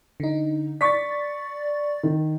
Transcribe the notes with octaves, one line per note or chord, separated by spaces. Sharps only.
D3 D#4
D5 C#6 A6 B6
D#3